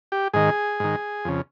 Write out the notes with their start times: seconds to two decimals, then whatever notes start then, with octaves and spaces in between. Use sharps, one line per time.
0.12 G4
0.34 G#2 D#3 G#4
0.80 G#2 D#3
1.25 F2 C#3